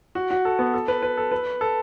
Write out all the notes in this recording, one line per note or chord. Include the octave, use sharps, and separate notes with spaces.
F#4
F#4
A4
B3
A4
B4
B4
A4
B4
A4